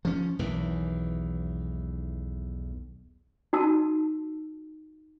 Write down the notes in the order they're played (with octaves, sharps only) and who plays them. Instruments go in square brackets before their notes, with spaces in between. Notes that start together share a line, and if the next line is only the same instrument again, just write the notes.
[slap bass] F3 C#4
B1 E2 D#3 E3
[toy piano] D#4 F#4 A5 E6